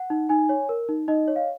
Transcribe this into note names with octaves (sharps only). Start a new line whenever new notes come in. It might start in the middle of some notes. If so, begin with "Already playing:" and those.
Already playing: F#5
D#4
D#4 G#5
C#5
A#4
D#4
D#4 D#5
C#5
F5